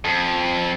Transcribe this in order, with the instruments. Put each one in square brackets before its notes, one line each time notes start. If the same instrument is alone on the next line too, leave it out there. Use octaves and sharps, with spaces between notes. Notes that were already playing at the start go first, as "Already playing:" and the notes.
[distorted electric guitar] F2